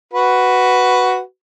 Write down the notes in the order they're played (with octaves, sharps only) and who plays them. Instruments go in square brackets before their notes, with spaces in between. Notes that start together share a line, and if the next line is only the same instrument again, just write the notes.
[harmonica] F#4 B4